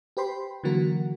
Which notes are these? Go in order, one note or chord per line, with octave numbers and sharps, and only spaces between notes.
G4 B4 C5 G5 B5 C6
D3 E3 F#3 A#3 F#4 A#4